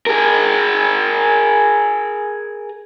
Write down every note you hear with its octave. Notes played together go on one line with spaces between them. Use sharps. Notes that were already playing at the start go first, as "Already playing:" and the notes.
G#4 A#4